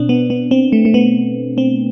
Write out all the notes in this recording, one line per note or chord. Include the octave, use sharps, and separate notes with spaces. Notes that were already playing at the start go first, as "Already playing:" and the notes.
Already playing: B2 C4 D4
B3
B3
C4
A3
A3
B3
C4